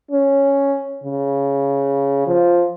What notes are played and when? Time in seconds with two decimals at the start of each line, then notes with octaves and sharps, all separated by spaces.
0.11 C#4
1.03 C#3
2.27 F3